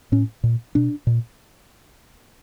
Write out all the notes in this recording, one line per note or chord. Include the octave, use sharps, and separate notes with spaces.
A2 C#4
A#2
B2 D4
A#2